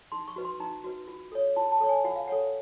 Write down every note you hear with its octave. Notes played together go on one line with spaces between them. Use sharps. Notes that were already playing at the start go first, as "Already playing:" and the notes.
D#4 C6
C#6
F#4 B4
C6
D#4 A#5
F#4 B4
F4
A4 C#5
F4 A5
A5
A4 C#5
G#5
F4 F#5
F5
A4 C#5 F#5